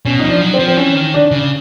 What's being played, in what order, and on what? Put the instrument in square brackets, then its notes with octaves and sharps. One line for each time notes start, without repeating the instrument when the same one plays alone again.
[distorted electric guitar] B2 [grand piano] C#4
[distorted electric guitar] F3 [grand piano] D#4
[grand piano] D4
[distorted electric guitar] F#3
[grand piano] C4
[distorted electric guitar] F3
[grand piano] C4
[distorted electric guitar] E3 [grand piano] C#4
[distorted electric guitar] D#3
[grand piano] D4
[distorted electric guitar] C#3